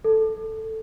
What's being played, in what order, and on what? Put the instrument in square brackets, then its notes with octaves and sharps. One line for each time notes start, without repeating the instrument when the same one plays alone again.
[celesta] A4